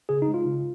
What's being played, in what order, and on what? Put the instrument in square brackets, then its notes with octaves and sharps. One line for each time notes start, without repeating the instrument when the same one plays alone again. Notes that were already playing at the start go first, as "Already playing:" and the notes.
[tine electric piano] C#3 G#4
D#4
G#3
F4
C#3